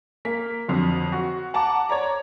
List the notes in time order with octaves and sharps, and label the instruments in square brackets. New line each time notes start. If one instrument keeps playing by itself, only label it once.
[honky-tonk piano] A#3 A#4 B6
F2 D3 F#3
F#4
F#5 A5 A#5 D6
C#5 D5 A#5